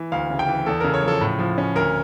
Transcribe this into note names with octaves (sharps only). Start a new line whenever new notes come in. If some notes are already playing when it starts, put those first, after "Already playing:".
Already playing: E3
D2 F5
C#3
G5
E3
E2 A4
C#3 A#4
C#5
F3 A4
A2
F3
C#4
D2 A#4